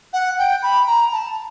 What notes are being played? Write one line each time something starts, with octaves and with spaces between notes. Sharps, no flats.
F#5
G5
B5
A#5
A5